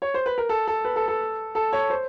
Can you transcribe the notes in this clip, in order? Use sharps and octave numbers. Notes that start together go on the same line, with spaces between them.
C#5
C5
B4
A#4
A4
A4
B4
A4
A4
A4
C#5
C5